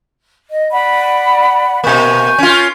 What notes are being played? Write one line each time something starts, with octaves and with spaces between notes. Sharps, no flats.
D#5
D5 F#5 B5
B2 A#3 G#5 C#6 G6
C#4 F4